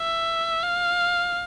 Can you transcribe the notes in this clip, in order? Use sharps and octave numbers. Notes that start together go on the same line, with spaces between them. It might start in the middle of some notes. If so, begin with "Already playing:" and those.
Already playing: E5
F5